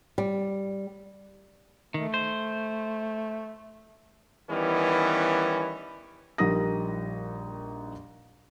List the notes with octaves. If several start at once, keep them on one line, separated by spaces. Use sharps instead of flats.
G3
D#3 A3
C5
D#3 E3 G3 B3 C#4
A#1 G3 D#4 A#4 D#6 A#6